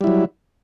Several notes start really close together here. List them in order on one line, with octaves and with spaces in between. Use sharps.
G3 E4 F#3